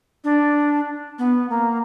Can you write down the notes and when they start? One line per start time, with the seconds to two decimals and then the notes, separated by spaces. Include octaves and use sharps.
0.24 D4
1.19 B3
1.50 A#3